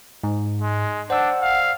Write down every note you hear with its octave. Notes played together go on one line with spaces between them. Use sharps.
G#2
G#3
D4 C5 D5 F#5 E6
F5